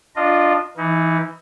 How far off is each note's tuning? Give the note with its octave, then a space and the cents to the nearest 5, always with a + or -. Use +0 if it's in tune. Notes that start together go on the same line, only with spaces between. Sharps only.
D4 +0 F4 +0 D#5 -20
E3 +5 D#4 +35